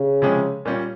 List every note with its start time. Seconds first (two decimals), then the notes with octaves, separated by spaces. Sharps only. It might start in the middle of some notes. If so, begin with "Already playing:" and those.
Already playing: C#3
0.22 C3 F3 G#3 C#4 G#4
0.65 A#2 G3 C#4 F4